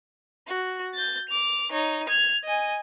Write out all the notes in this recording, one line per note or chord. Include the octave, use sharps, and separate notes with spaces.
F#4
G6 A6
D6 F7
D#4 C#5
G#6 F7
D#5 G#5